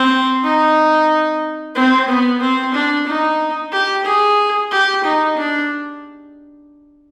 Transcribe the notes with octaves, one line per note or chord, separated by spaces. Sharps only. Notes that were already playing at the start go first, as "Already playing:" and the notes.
Already playing: C4
D#4
C4
B3
C4
D4
D#4
G4
G#4
G4
D#4
D4